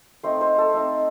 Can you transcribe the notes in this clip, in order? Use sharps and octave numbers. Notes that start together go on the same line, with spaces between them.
A3 C4 D#4 C5
C5
A4
A3 C4 D#4